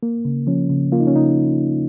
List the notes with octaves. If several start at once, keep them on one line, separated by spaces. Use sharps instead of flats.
A#3
C#3
F3 C#4
C#3
A#3 F4
D#4
C#4
C#3 D#4